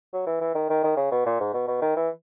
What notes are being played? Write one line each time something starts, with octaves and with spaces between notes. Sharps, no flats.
F#3
E3
E3
D#3
D#3
D#3
C#3
B2
A#2
G#2
B2
B2
D#3
E3